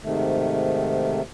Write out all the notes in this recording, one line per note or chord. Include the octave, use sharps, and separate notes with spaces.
G#2 C3 D#3 A3